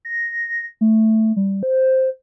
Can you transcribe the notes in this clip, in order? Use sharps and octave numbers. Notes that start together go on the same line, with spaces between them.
A#6
A3
G3
C5